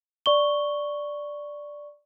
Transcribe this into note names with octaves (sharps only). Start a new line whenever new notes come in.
D5 C#6 G7